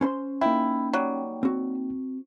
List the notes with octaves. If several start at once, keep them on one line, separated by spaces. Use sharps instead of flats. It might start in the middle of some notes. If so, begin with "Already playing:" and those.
C#4 C5 C6
A#3 D#4 E4 G5
F#3 G3
C4 F#4